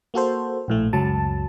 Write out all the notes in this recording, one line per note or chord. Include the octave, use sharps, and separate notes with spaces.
A#3 F#4 A4 C5
A#1 A2 A3
C#2 F#2 F#3 A5